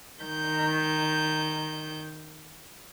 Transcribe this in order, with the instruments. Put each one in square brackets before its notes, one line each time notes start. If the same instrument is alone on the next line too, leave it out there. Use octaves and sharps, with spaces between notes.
[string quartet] D#3 G6